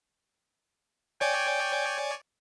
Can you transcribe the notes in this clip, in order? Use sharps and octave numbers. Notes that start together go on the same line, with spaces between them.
C#5 D5 G5 G#5